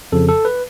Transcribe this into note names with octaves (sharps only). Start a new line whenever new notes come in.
F2 C#3 F3 A4
A4
B4